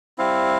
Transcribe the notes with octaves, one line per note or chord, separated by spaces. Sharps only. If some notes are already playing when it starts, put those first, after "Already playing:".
G3 C4 E4 F5